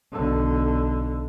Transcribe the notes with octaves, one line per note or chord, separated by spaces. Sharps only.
B1 D3